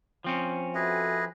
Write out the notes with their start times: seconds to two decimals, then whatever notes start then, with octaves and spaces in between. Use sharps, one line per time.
0.24 F3 C4 C#4
0.75 F#4 G#4 A4 B4 D#5 E5